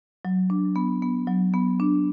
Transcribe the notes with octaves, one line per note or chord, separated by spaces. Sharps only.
F#3
D4
B3
B3
F#3
B3
D4